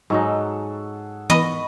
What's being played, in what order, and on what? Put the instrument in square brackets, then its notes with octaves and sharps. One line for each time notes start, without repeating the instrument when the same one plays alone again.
[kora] G#2 F#3 D#4 [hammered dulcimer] F#4 G#4 A4
[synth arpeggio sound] E3 B3 [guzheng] D#5 [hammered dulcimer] B5 C#6